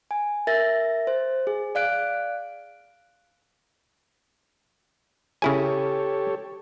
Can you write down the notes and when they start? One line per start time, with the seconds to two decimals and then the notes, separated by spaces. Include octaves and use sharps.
0.11 G#5
0.47 A#4 E5 A6 A#6
1.07 C5
1.47 G#4
1.75 D5 F5 F#6 D7
5.42 C#3 E4 G4 A4 C#5 G#5